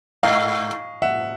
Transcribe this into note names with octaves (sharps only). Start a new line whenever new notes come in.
G#2 D#5 F5
E5 F#5